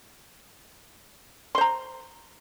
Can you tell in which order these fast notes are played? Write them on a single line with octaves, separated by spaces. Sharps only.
C6 C5 A#5